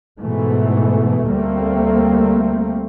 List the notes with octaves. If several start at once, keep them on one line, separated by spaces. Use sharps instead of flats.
G#2 B2 E3 A3
D2 G3 A3 A#3 C4